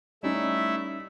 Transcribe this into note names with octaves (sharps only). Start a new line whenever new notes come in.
G3 A3 C#4 D#4 E4 E5